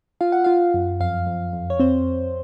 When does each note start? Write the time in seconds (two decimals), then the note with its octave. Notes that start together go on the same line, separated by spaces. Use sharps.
0.21 F4 F5
0.32 F#5
0.44 F4 F5
0.74 F#2
1.00 F2 F5
1.26 F2
1.53 F2
1.70 C#5
1.79 C4 C5